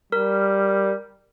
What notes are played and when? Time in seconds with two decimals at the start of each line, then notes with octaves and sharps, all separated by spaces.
0.12 G3 A#4